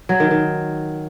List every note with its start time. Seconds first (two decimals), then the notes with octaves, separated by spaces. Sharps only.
0.09 F#3
0.20 D#3
0.31 D#3